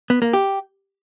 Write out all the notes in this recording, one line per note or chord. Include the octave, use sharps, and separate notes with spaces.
B3
A#3
G4